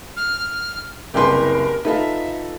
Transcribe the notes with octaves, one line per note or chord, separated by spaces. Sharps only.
F6
F#1 C2 G4 G#4 A#4 B4 C6
D#4 F4 A4 B4 E5